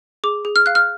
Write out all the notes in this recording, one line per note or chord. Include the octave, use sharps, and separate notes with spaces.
G#4 D6
G#4
F6
F5 F#6
F6